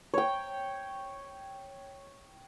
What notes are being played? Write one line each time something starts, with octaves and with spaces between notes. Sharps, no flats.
C#5 G5